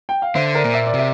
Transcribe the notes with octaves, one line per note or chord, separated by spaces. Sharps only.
G5
F5
D3 C5 E5
A#4 D5
A#2
E5
D5
C3 E5